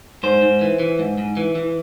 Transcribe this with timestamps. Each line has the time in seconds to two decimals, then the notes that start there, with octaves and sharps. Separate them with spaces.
0.23 G#2 C5
0.42 G#2
0.61 E3
0.79 E3
0.99 G#2
1.18 G#2
1.37 E3
1.55 E3